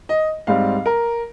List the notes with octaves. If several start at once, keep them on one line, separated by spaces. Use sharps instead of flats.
D#5
G#2 G3 C4 F5
A#4